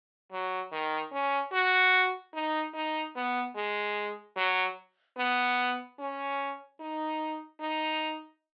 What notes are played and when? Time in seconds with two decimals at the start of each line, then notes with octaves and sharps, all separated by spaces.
0.32 F#3
0.72 D#3
1.12 C#4
1.52 F#4
2.34 D#4
2.74 D#4
3.16 B3
3.56 G#3
4.36 F#3
5.18 B3
5.99 C#4
6.80 D#4
7.61 D#4